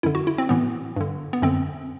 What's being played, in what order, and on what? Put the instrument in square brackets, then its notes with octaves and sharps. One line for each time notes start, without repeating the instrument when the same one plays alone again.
[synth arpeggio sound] F#2 D3 E4
F#4
E4
C4
A2 E3 B3
G2 D3
B3
F#2 D3 C4